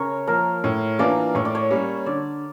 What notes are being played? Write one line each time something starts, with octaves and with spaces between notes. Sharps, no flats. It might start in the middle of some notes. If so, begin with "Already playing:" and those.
Already playing: C#3 A#4 C#5
F3 A#3 A#4
A2 C#5
E3 A#3 D4 F4 D5
A2 C#5
D5
C#5
G3 A#3 C#4
D3 D5